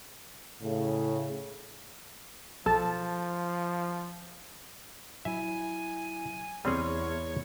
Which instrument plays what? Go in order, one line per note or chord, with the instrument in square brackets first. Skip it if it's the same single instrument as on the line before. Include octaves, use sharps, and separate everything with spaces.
[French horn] A2 [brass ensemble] C#3
[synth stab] B1 A4 A5 [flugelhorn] F3
[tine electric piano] F#3 E4 [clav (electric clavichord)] E5 [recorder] G#5
[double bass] E2 [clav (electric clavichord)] G3 C4 G#4 [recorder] C#5 [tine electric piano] D5 C6 F6